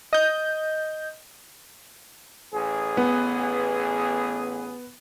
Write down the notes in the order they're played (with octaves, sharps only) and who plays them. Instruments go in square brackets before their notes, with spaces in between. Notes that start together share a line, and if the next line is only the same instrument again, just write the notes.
[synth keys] D#5 G6
[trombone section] A1 G#4
[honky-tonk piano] B3